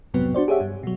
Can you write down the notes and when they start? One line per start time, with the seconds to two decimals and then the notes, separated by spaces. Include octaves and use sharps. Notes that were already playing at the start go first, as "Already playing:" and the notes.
0.14 B1 F2 G#2 C3 F#3 B3
0.34 D4 F#4 C5 D5
0.48 G4 G#4 C#5 E5 F#5
0.60 G2
0.83 B2 F#3